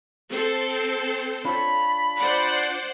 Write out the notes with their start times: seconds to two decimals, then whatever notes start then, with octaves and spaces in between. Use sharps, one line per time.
0.30 C4 A4 C5
1.45 D4 F4 C#5 B5
2.18 C5 D5 F#5